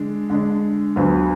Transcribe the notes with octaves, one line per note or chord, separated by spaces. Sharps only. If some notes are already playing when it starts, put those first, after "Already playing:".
Already playing: D3 G#3 D4
D3 G#3 D4
D2 D3 F#3 B3 F4